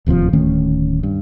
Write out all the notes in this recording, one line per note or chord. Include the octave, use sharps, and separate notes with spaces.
D1 D#2 C3 F3
D1 D#3 A3 C#4
G2